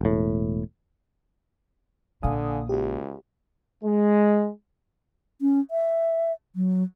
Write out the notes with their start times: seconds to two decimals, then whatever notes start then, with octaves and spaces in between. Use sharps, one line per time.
0.01 E1 A2
2.23 A#1 A#2 D3 F5 G#5 D#6
2.69 C#2 F#4 G4
3.84 G#3
5.41 C#4
5.71 E5
6.56 F#3